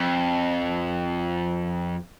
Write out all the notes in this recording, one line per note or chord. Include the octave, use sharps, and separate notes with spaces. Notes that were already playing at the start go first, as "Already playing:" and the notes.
Already playing: F2